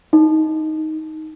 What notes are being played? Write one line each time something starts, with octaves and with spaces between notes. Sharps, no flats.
D#4